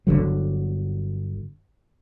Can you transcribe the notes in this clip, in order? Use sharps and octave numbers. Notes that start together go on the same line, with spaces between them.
G1 D#2 D3 F#3